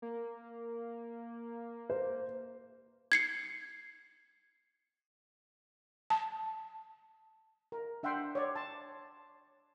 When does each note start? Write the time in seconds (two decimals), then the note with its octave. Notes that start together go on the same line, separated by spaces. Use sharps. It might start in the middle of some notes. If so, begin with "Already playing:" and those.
0.02 A#3
1.90 C5
3.12 G#6 C7 C#7
6.10 A5
7.72 A#4
8.03 D4 E5 F#5 G5 C6
8.35 C#5 D5
8.56 A5 C6